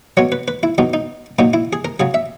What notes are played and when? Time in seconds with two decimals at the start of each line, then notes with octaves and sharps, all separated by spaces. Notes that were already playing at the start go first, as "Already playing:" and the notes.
0.17 B2 F#3 C#5
0.32 B4
0.48 B4
0.63 E4
0.78 B2 F#3 D#4
0.94 D#4
1.39 A#2 F#3 D#4
1.54 E4
1.73 G#4
1.85 A#4
2.00 C#3 F#3 G#4
2.14 E5